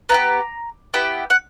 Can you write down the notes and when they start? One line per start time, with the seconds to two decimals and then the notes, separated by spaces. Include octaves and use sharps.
0.09 B3 E4 G4 A#5
0.94 B3 E4 G4 G5
1.30 F#5